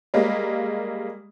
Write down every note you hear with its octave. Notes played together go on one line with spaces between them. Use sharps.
G3 G#3 A#3